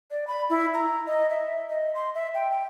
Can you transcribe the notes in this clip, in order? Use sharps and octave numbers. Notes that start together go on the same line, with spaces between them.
D5
B5
E4
A#5
D#5
E5
D#5
C6
E5
G5
G5